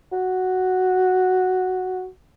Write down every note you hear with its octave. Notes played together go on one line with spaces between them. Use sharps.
F#4